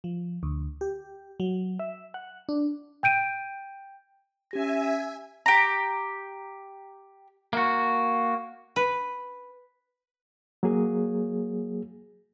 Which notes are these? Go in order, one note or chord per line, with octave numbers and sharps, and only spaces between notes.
F3
D2
G4
F#3
E5
F#5
D4
G5 G6 D7 D#7
C#4 G4 E5 G#5 A#6
G4 A#5
A#3 F#4
B4
F#3 A#3 G#4